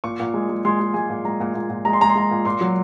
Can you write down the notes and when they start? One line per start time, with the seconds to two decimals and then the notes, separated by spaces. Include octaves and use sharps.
0.04 A#2 C#6
0.20 A#2
0.34 G#3
0.49 G#3
0.65 G#3 C6
0.80 G#3
0.94 G#3 G#5
1.09 A#2
1.25 G#3 A#5
1.40 A#2
1.54 A#2
1.70 A#2
1.85 G#3 A#5
1.93 C6
2.01 G#3 A#5
2.09 C6
2.15 G#3 A#5
2.31 A#2
2.45 A#2 C6
2.61 F#3